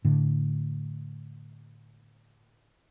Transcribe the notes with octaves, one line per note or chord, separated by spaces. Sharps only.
A2 D3